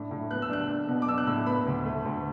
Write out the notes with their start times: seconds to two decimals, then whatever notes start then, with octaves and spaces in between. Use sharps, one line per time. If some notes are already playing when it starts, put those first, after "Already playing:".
Already playing: A2 D4
0.11 A2
0.31 B3 F#6
0.42 E6
0.50 D4 F#6
0.69 D4
0.88 B2
1.02 D6
1.08 D4 E6
1.18 F#6
1.27 A2 E6
1.46 B3 B5
1.66 D2
1.85 A3
2.05 D2